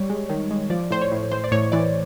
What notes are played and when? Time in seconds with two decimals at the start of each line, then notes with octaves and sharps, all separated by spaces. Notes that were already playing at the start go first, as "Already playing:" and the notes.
Already playing: G3 C#5
0.10 G#3
0.30 D#3
0.51 G#3
0.70 F3 D5
0.91 A2 C5
1.02 C#5
1.12 A2
1.31 E3 C5
1.44 D5
1.52 A2 C#5
1.72 E3 D5